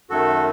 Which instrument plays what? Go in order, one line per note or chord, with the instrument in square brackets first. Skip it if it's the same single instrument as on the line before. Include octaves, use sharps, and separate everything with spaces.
[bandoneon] F#2 D#3 A3 F#4 A4